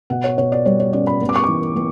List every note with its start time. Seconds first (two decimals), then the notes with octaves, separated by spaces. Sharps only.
0.10 B2 F#5
0.24 C#5
0.38 B2 C#5
0.52 D5
0.65 G3 C#5
0.80 C#5
0.93 C#4 D5
1.07 B5
1.21 B3
1.29 D6
1.36 C#6
1.44 E3 D6
1.76 B3